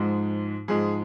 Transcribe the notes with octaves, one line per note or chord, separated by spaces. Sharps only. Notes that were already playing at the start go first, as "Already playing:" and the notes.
Already playing: G#2 F3 G#3
G#2 F3 G#3 G#4